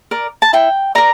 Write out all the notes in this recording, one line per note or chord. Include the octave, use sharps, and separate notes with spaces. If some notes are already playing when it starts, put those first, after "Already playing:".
A#4 D5
A5
E4 G5
A#4 D5 A#5